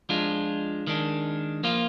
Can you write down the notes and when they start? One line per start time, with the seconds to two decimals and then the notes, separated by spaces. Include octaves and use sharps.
0.09 F3 G#3 D4 F4
0.87 D#3 G#3 D4
1.64 F3 A#3 F4